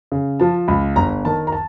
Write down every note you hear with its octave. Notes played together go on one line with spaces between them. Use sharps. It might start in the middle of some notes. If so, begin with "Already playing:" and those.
C#3
F3 A5
C#2 B5
G1 A#5
D#3 A5
A#5
A5